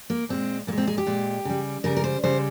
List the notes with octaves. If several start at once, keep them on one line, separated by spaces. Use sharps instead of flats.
A#3
A#2 G#3 C4
A#2 G#3 A#3
C4
G#4
G4
A#2 G#3
C#3 G3
C#3 G3 A#4
A#4
C5
C#3 G3 C5